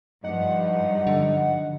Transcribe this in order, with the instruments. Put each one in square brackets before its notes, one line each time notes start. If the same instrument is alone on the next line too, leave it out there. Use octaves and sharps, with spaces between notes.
[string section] G2 F3 [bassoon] D#4 [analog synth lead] F#5
[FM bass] D3